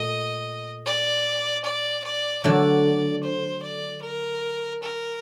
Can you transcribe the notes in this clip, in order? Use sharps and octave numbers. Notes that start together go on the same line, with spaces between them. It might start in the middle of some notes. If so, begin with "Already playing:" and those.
Already playing: A#2 A3 D#5
D5
D5
D5
D3 F#3 A3 D5
C5
D5
A#4
A#4